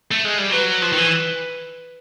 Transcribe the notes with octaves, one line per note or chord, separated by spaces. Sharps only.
A3
G#3
G3
F#3 B4
F3
D#3
E3